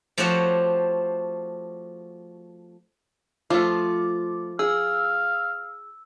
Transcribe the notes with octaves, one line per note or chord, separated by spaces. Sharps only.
F3 A3 C4 F#4 G4 C#5
F3 A3 F4 D6
G#4 F5 E6